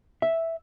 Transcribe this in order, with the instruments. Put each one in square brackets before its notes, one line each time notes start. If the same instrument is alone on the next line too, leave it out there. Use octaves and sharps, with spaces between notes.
[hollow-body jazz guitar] E5